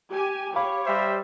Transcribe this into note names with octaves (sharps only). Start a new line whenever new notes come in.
G4 G#5
G4 C#5 F5 B5 D6
G3 C5 E5